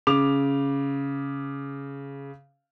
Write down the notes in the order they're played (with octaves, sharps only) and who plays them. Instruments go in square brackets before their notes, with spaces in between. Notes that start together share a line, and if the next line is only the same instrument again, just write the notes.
[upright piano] C#3 D6 F7